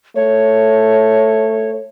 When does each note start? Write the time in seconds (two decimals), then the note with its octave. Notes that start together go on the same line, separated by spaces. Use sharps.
0.16 A3 C#5